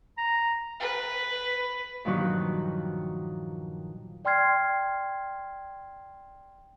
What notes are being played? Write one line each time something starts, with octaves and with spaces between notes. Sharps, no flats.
A#5
B4
G2 A#2 D#3 F3 F#3 F#4
D5 G5 C6 F6 G#6 C7